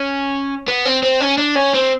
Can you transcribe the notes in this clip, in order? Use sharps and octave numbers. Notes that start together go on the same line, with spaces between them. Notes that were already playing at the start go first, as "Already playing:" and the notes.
Already playing: C#4
B3
C4
C4
C#4
D4
C#4
C4